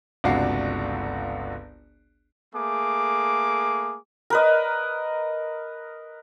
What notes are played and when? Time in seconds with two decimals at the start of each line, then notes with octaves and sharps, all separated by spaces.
0.24 G1 C#2 C3 D4 F#4 C7
2.53 A3 A#3 G#4 D6
4.30 A#4 B4 D#5